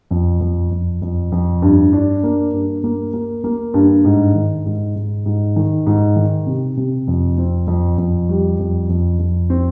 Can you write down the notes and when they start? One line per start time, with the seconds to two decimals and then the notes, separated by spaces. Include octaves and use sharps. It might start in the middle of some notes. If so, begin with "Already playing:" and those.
0.11 F2
0.41 F2
0.71 F2
1.02 F2
1.32 F2
1.62 G2
1.93 D4
2.23 A#3
2.53 G2
2.84 A#3
3.13 A#3
3.44 A#3
3.74 G2
4.05 G#2
4.35 D#3
4.66 G#2
4.96 G#2
5.26 G#2
5.56 D#3
5.87 G#2
6.16 D#3
6.46 C3
6.77 C3
7.07 F2
7.38 C4
7.67 F2
7.98 F2
8.29 G3
8.59 F2
8.89 F2
9.19 F2
9.50 C4